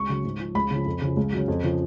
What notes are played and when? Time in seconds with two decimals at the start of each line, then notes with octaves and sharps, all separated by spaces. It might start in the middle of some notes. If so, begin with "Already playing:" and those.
Already playing: C#2 C#6
0.09 C#3 F#3
0.24 G#2
0.39 F3
0.55 C#2 B5
0.71 C#3 F3
0.86 F2
1.02 C#3 F3
1.17 C#2
1.32 C#3 F#3
1.48 F2
1.63 C#3 F3